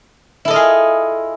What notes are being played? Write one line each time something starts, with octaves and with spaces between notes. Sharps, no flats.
E4 F4 G#4 A4 D#5